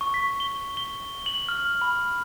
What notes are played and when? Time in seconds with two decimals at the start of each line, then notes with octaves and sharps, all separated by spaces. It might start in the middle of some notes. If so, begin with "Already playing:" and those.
0.01 C#6
0.14 B6
0.40 G7
0.77 G7
1.26 F#7
1.49 F6
1.82 B5